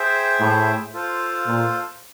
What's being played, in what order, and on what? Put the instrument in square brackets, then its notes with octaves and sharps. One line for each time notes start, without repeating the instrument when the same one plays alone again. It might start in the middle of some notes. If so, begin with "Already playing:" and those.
Already playing: [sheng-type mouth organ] G#4 C5 E5 G5
[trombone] A2
[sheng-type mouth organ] F4 A4 C5 F5
[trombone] A#2